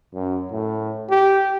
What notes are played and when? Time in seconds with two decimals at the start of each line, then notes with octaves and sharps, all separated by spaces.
0.14 F#2
0.51 A2
1.09 G4